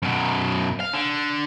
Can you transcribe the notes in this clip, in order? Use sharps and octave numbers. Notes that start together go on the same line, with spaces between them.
F#2 B2
F5
D3